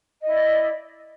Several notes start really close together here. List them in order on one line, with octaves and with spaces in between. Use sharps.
D#5 E4 D5